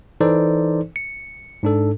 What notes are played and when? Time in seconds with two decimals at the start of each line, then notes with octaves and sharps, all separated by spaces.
0.21 E3 D#4 A4 C5 D5
0.96 C#7
1.63 G#2 D4 A4